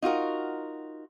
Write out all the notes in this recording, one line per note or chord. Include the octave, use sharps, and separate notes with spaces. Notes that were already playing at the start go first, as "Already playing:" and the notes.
D#4 F4 F#4 A#4